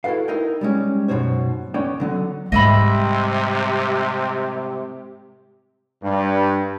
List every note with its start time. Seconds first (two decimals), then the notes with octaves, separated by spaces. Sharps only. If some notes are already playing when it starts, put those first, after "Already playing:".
0.04 E4 F#4 A4 B4 F5
0.28 D#4 E4 A#4 D#5 G5
0.61 G3 G#3 C#4
1.08 F#2 B2 D#3 D#4 C5 C#5
1.74 B3 C#4 C#5 D5 G5
2.00 D3 F#3 B3
2.52 G#2 C3 G3 G4 D#5 E5 B5
6.02 G2